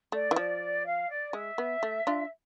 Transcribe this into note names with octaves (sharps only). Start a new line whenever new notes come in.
A3 D5
E3
F3 D5
F5
D5
G#3 E5
B3
A3
D4 F4